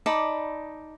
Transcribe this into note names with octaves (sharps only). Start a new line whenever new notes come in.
D#4 D5 A5 B5